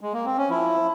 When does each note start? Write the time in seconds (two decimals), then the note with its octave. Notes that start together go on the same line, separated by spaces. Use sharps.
0.01 G#3
0.13 A#3
0.25 C4
0.37 C#4
0.50 F3 E4